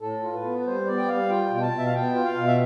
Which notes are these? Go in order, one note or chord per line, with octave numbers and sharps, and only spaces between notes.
A2 A4
F4
B4
B3
B4
G3 C5
B3 D5
G5
G3 F5
F4 G5
B2
G5
A5
B2
E5
F5
B3 G5
F4
F5
B2
E5